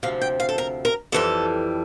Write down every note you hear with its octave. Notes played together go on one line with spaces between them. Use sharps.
D2 C3 F3 F5
G5
F5
A4
A#4
A#4
F2 E3 G3 A4